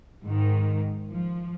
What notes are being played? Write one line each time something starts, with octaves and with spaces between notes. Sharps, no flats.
G#2 D#3
F3